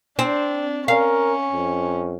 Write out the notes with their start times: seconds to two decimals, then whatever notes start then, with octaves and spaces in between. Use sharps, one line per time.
0.19 C4 D4
0.88 C#4 A#4 F5
1.52 F2